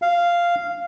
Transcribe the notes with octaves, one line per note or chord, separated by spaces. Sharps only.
F5